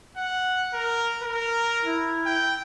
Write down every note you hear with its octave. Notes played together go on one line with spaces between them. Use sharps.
F#5
A#4
A#4
E4
G5